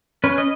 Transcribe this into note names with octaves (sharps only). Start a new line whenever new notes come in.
C#4 B4
D#5